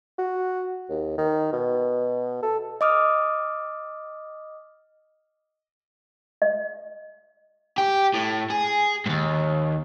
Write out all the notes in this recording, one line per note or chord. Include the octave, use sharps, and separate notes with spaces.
F#4
D#2
D#3
B2
A4
D#5 D6 D#6 F6
D#5
G4
A2
G#4
D#2 G#2